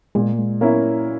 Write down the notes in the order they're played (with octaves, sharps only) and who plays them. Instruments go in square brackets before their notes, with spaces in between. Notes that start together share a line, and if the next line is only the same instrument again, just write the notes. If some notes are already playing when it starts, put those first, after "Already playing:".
[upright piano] A#2 [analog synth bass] G#3
[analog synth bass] A#3
G#3
[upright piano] A#3 C#4 E4 [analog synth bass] B3
[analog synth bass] A#3